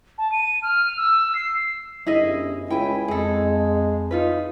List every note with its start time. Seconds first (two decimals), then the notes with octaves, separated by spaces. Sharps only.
0.18 A5
0.32 D#7
0.63 F6
0.97 E6
1.35 C7
2.06 G1 F#2 E4 G#4 D#5
2.70 C#2 E4 G5 G#5
3.08 F2 G#3 G#4 A4
4.11 D#4 F4 B4